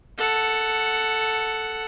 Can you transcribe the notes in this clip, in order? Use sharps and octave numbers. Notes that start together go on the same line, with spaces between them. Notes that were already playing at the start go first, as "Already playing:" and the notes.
A4 F#5